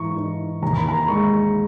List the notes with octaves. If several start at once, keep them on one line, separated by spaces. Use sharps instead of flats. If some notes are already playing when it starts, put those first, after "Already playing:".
Already playing: G#2 E3 A#5 C#6
D#4
D#2 A#5
B5
A#5
G#3 C#6